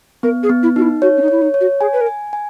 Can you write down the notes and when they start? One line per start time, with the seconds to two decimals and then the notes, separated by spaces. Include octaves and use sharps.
0.23 B3 A#4
0.43 G#4
0.49 B3
0.63 E4
0.76 D#4 F#4
0.82 E4
1.02 F#4 C#5
1.17 C#4
1.22 D#4
1.28 E4 C#5
1.42 D#4
1.54 C#5
1.60 F#4
1.81 G#4 G#5
1.93 B4
2.01 A#4
2.07 G#5
2.33 G#5